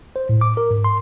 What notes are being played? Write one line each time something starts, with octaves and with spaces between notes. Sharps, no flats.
C5
A2
D6
A#4
G#2
C6